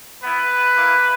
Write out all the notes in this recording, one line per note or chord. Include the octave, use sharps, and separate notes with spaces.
B3 E4 B4
A#3 E4